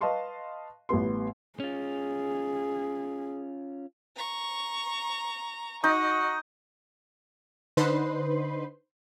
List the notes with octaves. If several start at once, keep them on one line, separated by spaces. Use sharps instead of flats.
B4 D#5 F5 A5 C6 C#6
A1 G3 B3 C6
C#4 F4 G#4
A#5 C#6
D#4 F#4 D#5
D3 D#4 B4 C5 C6